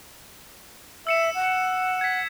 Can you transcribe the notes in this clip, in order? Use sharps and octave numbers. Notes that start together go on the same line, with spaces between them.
E5 E6 C#7 E7
F#5
G#6 B6